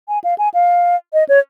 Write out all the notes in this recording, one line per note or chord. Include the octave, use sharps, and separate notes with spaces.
G#5
F5
G#5
F5
D#5
C#5